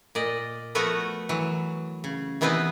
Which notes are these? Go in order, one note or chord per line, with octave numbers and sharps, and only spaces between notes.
A#2 D5 D#5
F3 A3 B3 F#4 A#4 B4
E3 F#3
C#3
C3 E3 B3 C4 D#4 B4